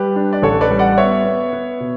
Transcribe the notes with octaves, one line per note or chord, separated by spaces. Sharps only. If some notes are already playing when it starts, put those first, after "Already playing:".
Already playing: G3 G4 B4
D4
D5
A1 A4 C#5
B4 D5
G3
D5 F#5
B3 C#5 E5
B3
B3
B2